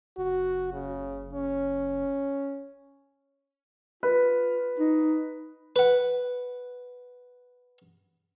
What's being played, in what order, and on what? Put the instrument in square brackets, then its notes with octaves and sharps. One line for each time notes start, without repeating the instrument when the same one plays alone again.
[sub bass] F#1 [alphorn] F#4
[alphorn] C#3
C#4
[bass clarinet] F4 [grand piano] B4
[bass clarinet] D#4
[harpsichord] B4 F#5